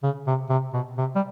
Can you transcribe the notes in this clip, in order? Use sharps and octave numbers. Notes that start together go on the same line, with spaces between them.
C#3
C3
C3
B2
C3
G3